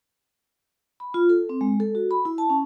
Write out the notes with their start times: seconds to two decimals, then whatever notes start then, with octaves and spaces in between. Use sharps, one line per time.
1.00 B5
1.14 F4
1.29 A4
1.49 C4
1.61 G#3
1.80 A4
1.95 F#4
2.11 B5
2.25 E4
2.38 A5
2.50 C#4